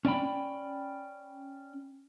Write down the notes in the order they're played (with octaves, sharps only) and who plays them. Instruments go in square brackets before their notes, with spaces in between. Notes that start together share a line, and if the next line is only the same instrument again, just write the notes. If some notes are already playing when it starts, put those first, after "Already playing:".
[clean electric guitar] C#4 D5 G5 B5